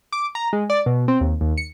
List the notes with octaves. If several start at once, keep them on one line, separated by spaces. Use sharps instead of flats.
D6
A#5
G#3
D5
B2
C4
D#2
D#2
C#7